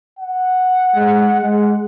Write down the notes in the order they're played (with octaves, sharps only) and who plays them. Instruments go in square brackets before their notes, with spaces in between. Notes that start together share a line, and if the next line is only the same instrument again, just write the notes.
[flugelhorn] F#5
[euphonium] G#3
G#3